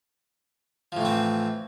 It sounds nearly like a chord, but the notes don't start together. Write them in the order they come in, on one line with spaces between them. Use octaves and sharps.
F3 A2 E3 C4